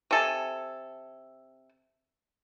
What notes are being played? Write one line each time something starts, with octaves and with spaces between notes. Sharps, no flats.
C3 A4 G#5